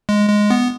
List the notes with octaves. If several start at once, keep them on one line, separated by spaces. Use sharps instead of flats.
G#3
G#3
B3